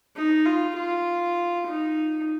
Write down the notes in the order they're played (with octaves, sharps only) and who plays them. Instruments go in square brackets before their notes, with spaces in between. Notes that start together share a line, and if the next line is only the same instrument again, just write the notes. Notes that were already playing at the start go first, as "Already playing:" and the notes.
[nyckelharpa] D#4
F4
F4
D#4